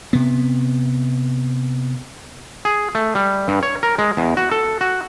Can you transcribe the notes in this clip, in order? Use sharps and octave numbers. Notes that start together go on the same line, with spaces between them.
C3 B3
G#4
A3
G3
G2
C#5
A#4
G#3
E2
F#4
A4
F#4